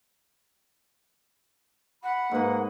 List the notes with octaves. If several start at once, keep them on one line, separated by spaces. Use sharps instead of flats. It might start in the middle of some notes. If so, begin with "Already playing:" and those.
F#5 B5
G#2 A#3 B4